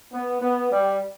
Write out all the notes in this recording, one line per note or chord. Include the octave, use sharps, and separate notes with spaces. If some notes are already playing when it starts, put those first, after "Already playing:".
B3
B3
G3